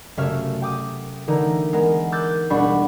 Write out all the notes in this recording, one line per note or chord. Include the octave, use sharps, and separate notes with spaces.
F#1 C3 A3 C#5 E5 F6
G5 D6 D#6
D3 E3 D#4 A#4
G#3 B3 A#4
D6 E6 F#6 G6 A6
E1 G3 D4 F#5 B5 C#6